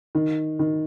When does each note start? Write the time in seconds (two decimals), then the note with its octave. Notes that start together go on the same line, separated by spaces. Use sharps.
0.15 D#3
0.59 D#3